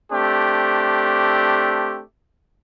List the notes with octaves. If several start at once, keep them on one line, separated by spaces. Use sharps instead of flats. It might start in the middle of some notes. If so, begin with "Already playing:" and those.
A3 C4 D4 G4